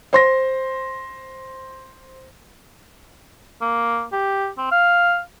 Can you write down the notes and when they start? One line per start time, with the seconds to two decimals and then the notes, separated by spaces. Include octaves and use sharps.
0.13 C5 C6 A#6
3.61 A#3
4.12 G4
4.58 C4
4.72 F5